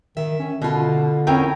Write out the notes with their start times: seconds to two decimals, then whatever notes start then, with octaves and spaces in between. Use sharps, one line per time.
0.17 D#3 E5
0.40 C#4
0.62 B2 D3 F4 D#5
1.27 C4 C#4 A#4 G5